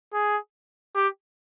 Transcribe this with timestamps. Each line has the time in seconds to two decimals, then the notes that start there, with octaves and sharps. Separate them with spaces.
0.13 G#4
0.95 G4